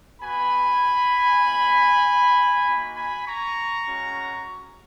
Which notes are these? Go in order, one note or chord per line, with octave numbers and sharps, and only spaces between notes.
B3 F#4 G#5 B5
A#3 C#4 E4
A#3 D#4 F#4
G#5 B5
A#5 C#6
G#3 C#4 F#4